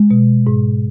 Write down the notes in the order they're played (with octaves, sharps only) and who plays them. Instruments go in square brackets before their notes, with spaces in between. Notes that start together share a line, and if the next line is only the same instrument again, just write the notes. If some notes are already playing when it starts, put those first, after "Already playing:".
Already playing: [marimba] G#3
B2
G#2